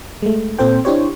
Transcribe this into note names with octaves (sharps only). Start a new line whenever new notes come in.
G#3 A3
A#2 C4 A4 C5 G5
D4 E4 G4 C5 C#5